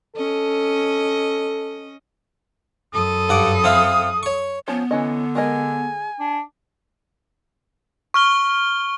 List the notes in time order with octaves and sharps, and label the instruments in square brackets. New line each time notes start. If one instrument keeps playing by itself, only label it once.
[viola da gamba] C#4 D#5 [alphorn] A4
[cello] F#2 A4 [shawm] D#6
[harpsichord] G2 F#5 D6
C4 E4 F5
C#5 C#6
[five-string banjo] F3 C#4 [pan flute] B3
[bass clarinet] D3 [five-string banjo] E3 C#4 D#5
[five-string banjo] G#3 A#4 D#5 [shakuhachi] G#5
[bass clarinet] D4
[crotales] C#6 F6 G7